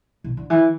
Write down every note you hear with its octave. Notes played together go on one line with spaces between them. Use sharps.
B2
D3
E3